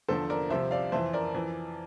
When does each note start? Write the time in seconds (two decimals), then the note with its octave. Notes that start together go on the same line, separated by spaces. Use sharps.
0.08 E2 D3 F3 A4 C5
0.30 A#4 D5
0.50 C2 C3 F3 C5 E5
0.71 D5 F5
0.92 F2 E3 C5 E5
1.13 A#4 D5
1.34 F2 E3